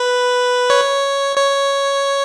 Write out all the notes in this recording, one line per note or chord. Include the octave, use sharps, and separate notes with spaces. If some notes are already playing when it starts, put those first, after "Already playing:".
Already playing: B4
C#5
C#5